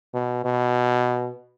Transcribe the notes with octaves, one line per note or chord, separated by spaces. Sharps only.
B2
B2